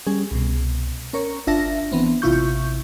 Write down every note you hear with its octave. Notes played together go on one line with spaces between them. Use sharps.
G3 C#4 G#4
C2 B2
C#4 A#4 C#5
G1 D4 F4 E5 A5 A#6
E3 B3 C4
A1 C3 E4 F4 C#6 G6